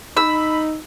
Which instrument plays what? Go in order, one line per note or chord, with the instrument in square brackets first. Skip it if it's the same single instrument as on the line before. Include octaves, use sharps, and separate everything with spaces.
[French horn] D#4 [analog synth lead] B5 [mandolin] E6